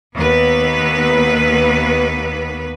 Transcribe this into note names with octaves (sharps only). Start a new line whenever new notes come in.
D#2 B3 B4